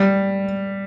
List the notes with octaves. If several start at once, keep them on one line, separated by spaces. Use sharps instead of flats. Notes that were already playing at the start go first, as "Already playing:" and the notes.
Already playing: G3